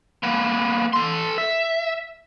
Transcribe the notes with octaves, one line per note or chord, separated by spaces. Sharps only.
A#3 B3
A4 C6
E5